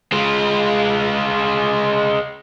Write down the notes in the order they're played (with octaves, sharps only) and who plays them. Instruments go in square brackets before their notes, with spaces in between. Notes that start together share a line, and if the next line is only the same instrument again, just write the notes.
[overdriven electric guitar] G#3 F4